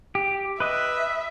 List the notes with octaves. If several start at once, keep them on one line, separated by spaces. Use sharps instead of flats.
G4
B4 D#5 E5